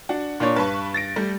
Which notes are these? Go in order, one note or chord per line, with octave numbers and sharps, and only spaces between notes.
D4 F#4
A#2 D4 C#5
G2 B4 A5 C#6
A6 A#6 D7
G3 A3